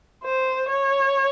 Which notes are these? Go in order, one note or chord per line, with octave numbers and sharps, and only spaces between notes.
C5
C#5